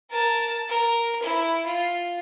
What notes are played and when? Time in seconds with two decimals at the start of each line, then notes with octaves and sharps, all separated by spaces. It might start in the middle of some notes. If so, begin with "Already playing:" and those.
0.11 A#4 A5
0.68 A#4
1.23 E4
1.67 F4